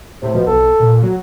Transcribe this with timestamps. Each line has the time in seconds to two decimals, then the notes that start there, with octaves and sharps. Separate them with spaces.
0.22 A2 C3
0.35 B2 F3
0.47 B1 A4
0.80 A#2
1.03 F#3